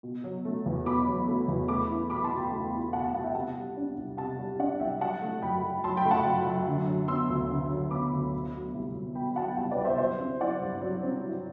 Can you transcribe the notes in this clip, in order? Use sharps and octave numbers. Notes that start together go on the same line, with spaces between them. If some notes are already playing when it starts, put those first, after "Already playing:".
B2
F#3
A3
E2
B2 B5 D6
F#3
A3
E2
A3 B5 D6
E4
B2 B5 D6
A5 C6
B2
G5 B5
A3
E4
B2 F#5 A5
F#5 A5
B2 F#5 A5
E5 G5
C3 F#5 A5
G3
D4
C2
C3 F#5 A5
G3
D4 D5 F#5
C2 E5 G5
F#3 F#5 A5
A3
F#2 G5 B5
F#2
F#3 A5 C6
G5 B5
A3
F#5 A5
F#2
F#2
D3
F#3
B3 C6 E6
D2
D3
F#3
B3 B5 D6
D2
B2
F#3
C2
C2
B2 G5 B5
F#3 F#5 A5
G5
C2 F#5 A5
B4 D5
C2
C5 E5
F#3 C5 E5
C4
E4 D5 F#5
G2
F#3
C4
E4